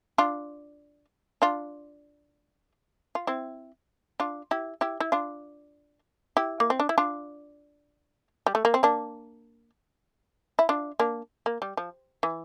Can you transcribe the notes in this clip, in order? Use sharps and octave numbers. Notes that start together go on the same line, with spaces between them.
D4 F4
D4 F4
F4
C4 E4
D4 F4
E4 G4
E4 G4
E4
D4 F4
E4 G4
A#3
C4
D4
E4
D4 F4
G3
A3
A#3
C4
A#3 D4
E4
D4 F4
A#3 D4
A#3
G3
F3
E3